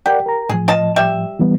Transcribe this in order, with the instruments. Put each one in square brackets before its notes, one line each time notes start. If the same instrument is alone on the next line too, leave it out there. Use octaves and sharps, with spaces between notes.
[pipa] G4 [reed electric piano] A#4 D5 F#5
[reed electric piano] A#4 A#5
[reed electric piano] A2 F3 [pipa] G#4
[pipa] F4 D#5 A5
G3 E5
[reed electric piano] E3 G3 B3